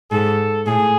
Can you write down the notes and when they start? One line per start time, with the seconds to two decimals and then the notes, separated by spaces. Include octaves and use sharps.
0.11 G#2 A4
0.67 A2 G#4